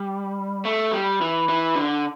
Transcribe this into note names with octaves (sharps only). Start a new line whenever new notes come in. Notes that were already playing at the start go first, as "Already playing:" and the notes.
Already playing: G3
A3
G3
E3
E3
D3